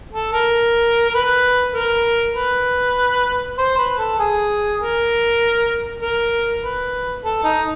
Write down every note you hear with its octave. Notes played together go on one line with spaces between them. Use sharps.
A4
A#4
A#4
B4
A#4
B4
C5
B4
A4
G#4
A#4
A#4
B4
A4
D#4